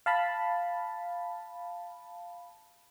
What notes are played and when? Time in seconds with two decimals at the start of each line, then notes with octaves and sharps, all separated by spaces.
0.06 F5 A5 B5